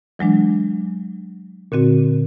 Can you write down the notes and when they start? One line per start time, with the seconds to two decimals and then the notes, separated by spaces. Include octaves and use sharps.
0.19 E3 F#3 G#3 D4
1.72 A#2 D3 C4 F#4